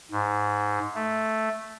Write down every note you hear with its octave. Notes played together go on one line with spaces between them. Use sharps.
G#2
A3